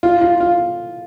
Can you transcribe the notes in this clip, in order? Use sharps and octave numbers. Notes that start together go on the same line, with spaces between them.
F4
F4
F4